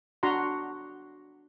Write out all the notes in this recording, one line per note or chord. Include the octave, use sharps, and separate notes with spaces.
D4 F#4 A#5 C6